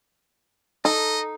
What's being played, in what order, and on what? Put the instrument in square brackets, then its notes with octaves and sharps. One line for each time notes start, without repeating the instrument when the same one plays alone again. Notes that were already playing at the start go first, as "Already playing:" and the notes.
[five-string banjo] D#4 [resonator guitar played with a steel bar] A4 [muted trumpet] D#5